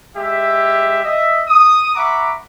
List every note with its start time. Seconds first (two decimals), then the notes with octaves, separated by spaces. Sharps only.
0.16 G#3 G4 G#4 E5
1.03 D#5 E5
1.47 D#6
1.95 E5 F#5 A#5 B5 C#6 D6